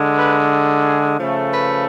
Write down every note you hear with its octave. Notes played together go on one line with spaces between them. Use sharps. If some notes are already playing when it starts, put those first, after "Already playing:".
Already playing: D3 G#3
B4
G#4
C#3 F3 A3
B4